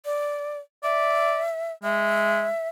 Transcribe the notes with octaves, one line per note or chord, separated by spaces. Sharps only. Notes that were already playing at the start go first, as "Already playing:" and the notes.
D5
D5 E5
G#3 E5